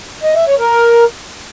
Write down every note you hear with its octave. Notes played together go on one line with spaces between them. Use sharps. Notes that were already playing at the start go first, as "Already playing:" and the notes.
D#5
E5
C#5
A#4